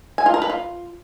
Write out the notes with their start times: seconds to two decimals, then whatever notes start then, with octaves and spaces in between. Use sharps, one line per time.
0.18 G#5
0.26 F4
0.34 A#4
0.42 B4
0.50 F4